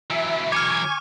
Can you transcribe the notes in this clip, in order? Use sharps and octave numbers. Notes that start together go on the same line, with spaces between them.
E3 F#3 E5
G#5 C#6 D6 F6 G#6